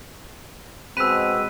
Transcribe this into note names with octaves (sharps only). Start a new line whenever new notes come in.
B2 G#3 C4 B5 E6 F#6 B6 D#7